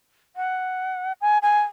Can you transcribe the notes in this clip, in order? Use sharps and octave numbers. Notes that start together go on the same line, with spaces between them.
F#5
G#5
G#5